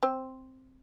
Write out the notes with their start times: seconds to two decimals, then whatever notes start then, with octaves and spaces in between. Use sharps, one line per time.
0.03 C4 C5